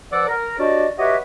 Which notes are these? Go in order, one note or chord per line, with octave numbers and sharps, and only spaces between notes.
G2 F3 D5 F#5 D6 E6
A#4
F#3 D4 F#4 G4 D5 D#5
F#4 G4 B4 C#5 D#5 E5